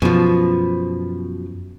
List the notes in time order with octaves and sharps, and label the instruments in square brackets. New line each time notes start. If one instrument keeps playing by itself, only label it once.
[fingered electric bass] F#2 [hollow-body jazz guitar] B2 F3